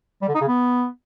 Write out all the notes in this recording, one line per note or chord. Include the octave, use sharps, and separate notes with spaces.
G3
D3
D#4
C#3
B3